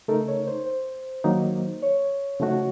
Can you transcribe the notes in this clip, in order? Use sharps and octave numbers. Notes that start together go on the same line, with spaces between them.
C#3 A3 D#4 A4 A#4
C#5
C5
C5
D#3 F#3 A#3 D#4
C#5
C#3 F3 A3 D#4 F#4